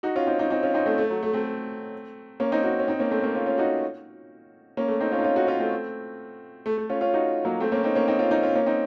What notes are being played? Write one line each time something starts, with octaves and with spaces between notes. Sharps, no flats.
D#4 F#4
C#4 F4
C4 D#4
C4 D#4
C4 D#4
C#4 F4
C4 D#4
A3 C4
A3
F#3
A3
A3 C4
A#3 C#4
C4 D#4
D#4 F#4
C#4
C4 D#4
A#3 C#4
A3 C4
A#3 C#4
C#4 F4
C#4 F4
D#4 F#4
A#3 C#4
A3
C4 D#4
C#4 F4
D#4
C#4 F4
D#4 F#4
C#4 F4
A3 C4
A3
A3
C#4 F4
C#4 F4
D#4 F#4
F#3 A#3
A3 C4
A#3 C#4
C4 D#4
A#3 C#4
C4 D#4
C#4 F4
C4 D#4
C#4 F4
A#3 C#4
C4 D#4